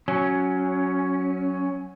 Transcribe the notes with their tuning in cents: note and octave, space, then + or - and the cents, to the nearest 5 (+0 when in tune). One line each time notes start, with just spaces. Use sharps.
F#3 +0 C#4 +0